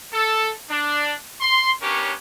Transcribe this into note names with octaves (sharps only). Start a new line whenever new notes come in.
A4
D4
C6
B3 C#4 D4 G4 A#4 C#5